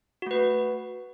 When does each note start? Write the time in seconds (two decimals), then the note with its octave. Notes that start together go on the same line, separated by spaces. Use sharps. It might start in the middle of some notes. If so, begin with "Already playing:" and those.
0.22 F#4
0.27 A3
0.31 B4